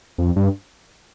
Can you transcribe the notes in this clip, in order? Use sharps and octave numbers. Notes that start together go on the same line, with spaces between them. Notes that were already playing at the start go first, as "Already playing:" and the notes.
F2
G2